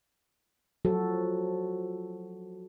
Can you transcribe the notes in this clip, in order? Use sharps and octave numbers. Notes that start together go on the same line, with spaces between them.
F3 F#3 F#4 A4